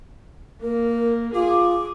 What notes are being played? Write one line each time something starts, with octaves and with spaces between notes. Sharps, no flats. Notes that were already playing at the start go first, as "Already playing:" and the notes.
A#3 A#4
F4 G#4 D6